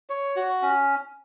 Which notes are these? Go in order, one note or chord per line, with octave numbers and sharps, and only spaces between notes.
C#5
F#4
C#4